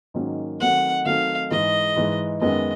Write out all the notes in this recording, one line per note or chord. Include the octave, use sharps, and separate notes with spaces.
G#2 D#3 F#3 A#3 C#4
D#3 F#3 A3 C4 D#4 F#5
D#3 F#3 A3 C4 D#4 F5
G#2 E3 G#3 D#5
G#2 E3 G#3
F#2 D#3 G#3 B3 D#5